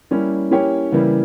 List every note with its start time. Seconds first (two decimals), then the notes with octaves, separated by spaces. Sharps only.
0.11 G3 A#3 C#4 E4
0.51 A#3 C#4 E4 G4 C#5
0.92 C#3 E3 G3 A#3 E4